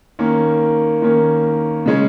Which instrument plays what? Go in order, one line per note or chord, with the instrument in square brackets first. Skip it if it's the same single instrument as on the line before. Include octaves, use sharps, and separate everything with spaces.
[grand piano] D#3 A#3 C#4
D#3 A#3 C#4
C#3 G#3 C#4